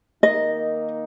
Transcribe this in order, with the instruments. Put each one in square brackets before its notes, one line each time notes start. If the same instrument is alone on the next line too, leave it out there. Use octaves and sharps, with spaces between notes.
[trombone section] D#3 A#3 D#4 [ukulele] D#5